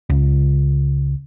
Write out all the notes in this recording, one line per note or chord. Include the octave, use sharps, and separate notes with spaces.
C#2